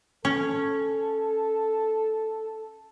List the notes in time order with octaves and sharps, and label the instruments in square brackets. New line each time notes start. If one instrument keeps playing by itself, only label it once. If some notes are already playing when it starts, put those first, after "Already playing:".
[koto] C#4 [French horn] A4